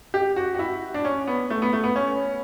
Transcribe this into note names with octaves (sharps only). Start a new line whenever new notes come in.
G4
F#4
F#4
E4
D4
C#4
B3
A3
B3
A3
B3
C#4